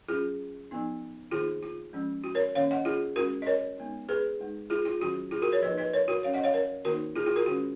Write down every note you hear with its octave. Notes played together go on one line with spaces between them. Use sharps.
F#3 C#4 F4 G#4
F3 B3 D#4
D#3 A#3 D#4 F4 G#4
F4
F3 G#3 C#4
F#4
A#4 C#5
D#3 A#3 C#4 C#5 F5
D#5 F#5
F4 G#4
G#3 C#4 F#4 A#4
D#5
A#4 C#5
G#3 B3 D#4
G#4 B4
G#3 D#4
F4 G#4
F4
D#3 F#3 C#4 F#4
F4 G#4
F#4 A#4
A#4 C#5
F3 A#3 D#4 B4 D#5
B4 D#5
A#4 C#5
F#4 A#4
F#3 C#4 C#5 F5
D#5 F#5
C#5 F5
A#4 C#5
D#3 A#3 D#4 F#4 A#4
F4 G#4
F4 G#4
F#4 A#4
D#3 G#3 C#4 F#4